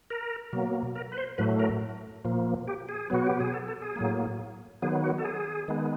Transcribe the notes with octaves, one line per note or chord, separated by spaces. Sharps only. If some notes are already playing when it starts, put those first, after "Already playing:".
A#4
B2 F#3 A#3
A#4
B4
C5
A2 F#3 A3 B4
A#4
A#2 F3 A#3
G4
G#4
B2 F#3 B3 F#4
G4
G#4
A4
A4
G#4
A2 F#3 A#3
D#3 F#3 B3 G#4
F#4
A4
G#4
D#3 G#3 B3